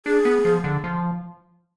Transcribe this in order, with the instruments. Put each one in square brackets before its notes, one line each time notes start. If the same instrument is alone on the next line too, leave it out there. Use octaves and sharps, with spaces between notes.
[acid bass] D4 [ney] G#4
[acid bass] B3
F3
D3
F3